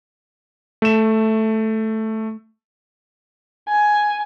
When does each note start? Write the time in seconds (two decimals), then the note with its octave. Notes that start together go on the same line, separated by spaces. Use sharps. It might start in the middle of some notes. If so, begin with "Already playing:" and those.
0.82 A3 E7
3.69 G#5